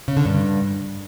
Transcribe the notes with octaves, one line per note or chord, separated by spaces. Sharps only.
C#3
D3
G2